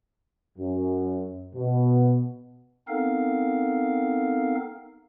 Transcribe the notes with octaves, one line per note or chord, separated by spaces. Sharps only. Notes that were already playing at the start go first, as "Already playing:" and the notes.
F#2
B2
B3 C4 D#4 A4 A#4 F5